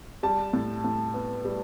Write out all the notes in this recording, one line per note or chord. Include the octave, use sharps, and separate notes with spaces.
G3 A5
A2
A2
B3
G3